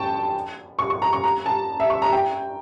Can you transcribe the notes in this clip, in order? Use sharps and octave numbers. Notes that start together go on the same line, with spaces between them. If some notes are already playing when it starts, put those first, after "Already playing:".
Already playing: G5 A5 C#6
C#6
C#6
A#5
C#6
A#5
A5
E5
C#6
A#5
G5